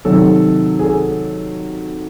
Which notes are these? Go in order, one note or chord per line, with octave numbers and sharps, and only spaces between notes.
C3 D#3 F#3 A4
G#4
A4